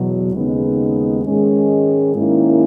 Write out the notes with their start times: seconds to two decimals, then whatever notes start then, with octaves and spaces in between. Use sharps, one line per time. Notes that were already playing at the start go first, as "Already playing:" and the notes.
Already playing: E2 B2 F#3
0.33 D#2 C#3 G#3 B3 D#4
1.24 G#2 D#3 G#3 C#4
2.16 G#2 D#3 A#3 C#4 E4